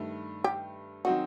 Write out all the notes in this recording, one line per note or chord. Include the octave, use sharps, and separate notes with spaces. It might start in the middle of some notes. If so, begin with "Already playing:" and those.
Already playing: G2 D#3 A3
G4
D#3 F#3 C4 D#4 F#4